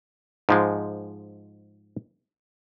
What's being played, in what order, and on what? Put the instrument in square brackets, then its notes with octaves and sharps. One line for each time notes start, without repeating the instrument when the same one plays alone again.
[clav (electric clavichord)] G#2 F3 G#3